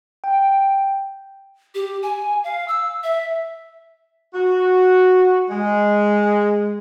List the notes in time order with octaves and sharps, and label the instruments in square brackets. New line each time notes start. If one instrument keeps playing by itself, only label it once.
[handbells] G5
[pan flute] G4
G#5
F5
E6
E5
[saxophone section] F#4
G#3